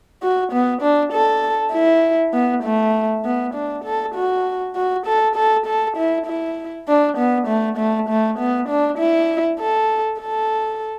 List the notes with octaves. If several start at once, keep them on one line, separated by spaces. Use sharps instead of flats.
F#4
B3
D4
A4
E4
B3
A3
B3
D4
A4
F#4
F#4
A4
A4
A4
E4
E4
D4
B3
A3
A3
A3
B3
D4
E4
A4
A4